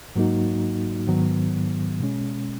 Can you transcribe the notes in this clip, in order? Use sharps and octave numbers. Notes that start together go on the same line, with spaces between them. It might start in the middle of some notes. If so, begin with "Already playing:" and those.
G#2 F#3 A#3 D#4 F#4
G#2 D#3 F#3 B3
B2 G#3 C#4